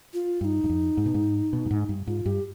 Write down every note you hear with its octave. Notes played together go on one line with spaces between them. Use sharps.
F4
G2 D#4 F4
G2
F2
G#2
B2
G#2
B2
G2
G#2
G2
G#2 F4
G2 G4